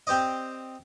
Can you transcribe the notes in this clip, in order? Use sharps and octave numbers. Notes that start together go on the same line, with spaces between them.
C4 G4 C5 D5 D#5